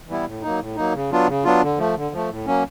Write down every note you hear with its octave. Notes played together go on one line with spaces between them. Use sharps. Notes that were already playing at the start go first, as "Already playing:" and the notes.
E3 G3 B3 E4
A2
F#3 A#3 D#4
A2
F#3 A#3 D#4
C#3
F#3 B3 D4 F4
C#3
F#3 B3 D4 F4
D3
F3 A3
D3
F3 A3
A2
F#3 A#3 C#4